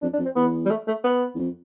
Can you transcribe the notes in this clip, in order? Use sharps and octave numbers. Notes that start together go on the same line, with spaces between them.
F2 D4
D4
F2
C4
E2 B3
G3
A3
A3
B3
E2
F2